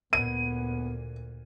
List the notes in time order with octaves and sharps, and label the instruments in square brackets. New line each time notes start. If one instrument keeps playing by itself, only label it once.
[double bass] D2 A#2 [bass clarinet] B3 [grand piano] D#7